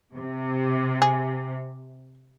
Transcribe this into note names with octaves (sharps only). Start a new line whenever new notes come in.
C3
G#4